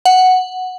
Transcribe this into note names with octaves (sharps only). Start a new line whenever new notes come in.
F#5